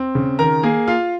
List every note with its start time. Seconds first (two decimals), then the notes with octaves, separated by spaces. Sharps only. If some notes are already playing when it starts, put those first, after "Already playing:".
Already playing: C4
0.15 C#3
0.39 D#3 A#4 A#5
0.63 A#3 G#4 G#5
0.87 F4 F5